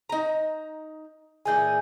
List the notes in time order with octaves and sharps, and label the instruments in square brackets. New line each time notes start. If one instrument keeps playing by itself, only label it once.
[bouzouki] D#4 A#5
[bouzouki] A#2 E3 G#4 [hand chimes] G#5 G6